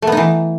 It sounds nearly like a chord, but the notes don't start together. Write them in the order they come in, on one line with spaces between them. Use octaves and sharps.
A3 B3 D#4 E3